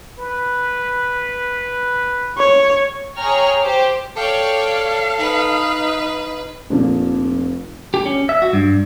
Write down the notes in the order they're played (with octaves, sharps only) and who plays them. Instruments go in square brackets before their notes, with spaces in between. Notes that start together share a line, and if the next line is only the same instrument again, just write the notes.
[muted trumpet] B4
[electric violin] C#5
[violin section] G#4 C#5 G5 A#5 C#6 F6
G4 C5 D6
[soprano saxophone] A4 [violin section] C#5 D5 G5 [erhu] F5
[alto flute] D#4 [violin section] B4
[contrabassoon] F1 [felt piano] A#1 F2 A#2
[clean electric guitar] G4
C#4
E5
F#4
G2